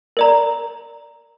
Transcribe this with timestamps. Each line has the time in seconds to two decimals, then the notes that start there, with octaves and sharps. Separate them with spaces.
0.17 A#4 D5 A#5